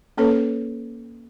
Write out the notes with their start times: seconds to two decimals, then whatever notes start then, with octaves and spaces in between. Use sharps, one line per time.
0.17 A#3 C#4 A4 B4 C#5